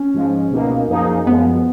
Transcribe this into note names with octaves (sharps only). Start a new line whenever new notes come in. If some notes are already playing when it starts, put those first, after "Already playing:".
Already playing: C#4
G#2 F3 G#3
C#2 B2 A#3 D#4
F#2 F3 A#3 D#4 G#4
F#2 F3 G#3 B3